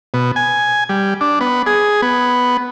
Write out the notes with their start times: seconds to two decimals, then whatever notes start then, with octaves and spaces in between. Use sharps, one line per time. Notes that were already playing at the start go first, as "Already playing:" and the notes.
0.14 B2
0.36 G#5
0.89 G3
1.21 D4
1.41 B3
1.66 G#4
2.02 B3